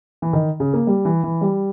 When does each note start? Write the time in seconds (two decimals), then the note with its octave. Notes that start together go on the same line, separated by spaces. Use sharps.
0.22 E3
0.33 D#3
0.60 C#3
0.74 A#3
0.87 G3
1.05 E3
1.23 E3
1.41 G3